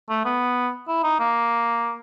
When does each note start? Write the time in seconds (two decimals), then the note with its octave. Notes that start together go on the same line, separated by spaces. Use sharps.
0.09 A3
0.25 B3
0.88 E4
1.03 D#4
1.19 A#3